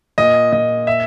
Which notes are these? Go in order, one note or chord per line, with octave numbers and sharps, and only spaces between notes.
A#2 D#5
A#2 D#5
E5